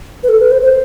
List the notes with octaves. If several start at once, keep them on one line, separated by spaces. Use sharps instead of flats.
B4
A4
B4
C5
C5